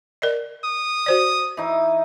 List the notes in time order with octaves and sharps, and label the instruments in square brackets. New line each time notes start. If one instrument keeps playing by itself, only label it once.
[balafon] A#4 D5 D#5
[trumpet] D#6
[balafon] F#4 C5 D5
[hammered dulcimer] E3 D#4